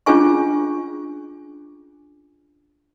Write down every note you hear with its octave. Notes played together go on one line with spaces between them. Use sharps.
C#4 D4 F4 G#4 G#5 C#6